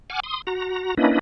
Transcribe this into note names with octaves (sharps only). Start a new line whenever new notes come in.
F#5 G#5 D6 F6
C6 D#6
F#4 A#5
A#3 C#4 D4 E4 B4 D#5